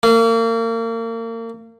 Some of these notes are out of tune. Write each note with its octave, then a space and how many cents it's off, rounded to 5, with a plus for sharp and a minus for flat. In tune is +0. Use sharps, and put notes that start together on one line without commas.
A#3 -35